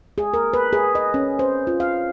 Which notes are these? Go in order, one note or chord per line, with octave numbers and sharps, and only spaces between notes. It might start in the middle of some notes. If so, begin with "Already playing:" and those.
G#4
A#4
B4
G#4
D#5
C#4
C5
F4
F5